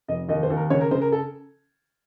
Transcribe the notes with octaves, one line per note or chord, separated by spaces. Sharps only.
F1 D#5
D#2 D#5
C5
D#2
A#4
C#3 C#5
A#4
C#3 C5
A#4
A4